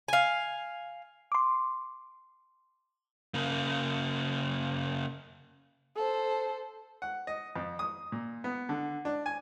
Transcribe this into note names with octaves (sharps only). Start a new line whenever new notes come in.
F5 G#5
C6 D6
C#3 A#3
A4 C5
F#5
D#5
F2
D#6
A#2
B3
D3
D4
G#5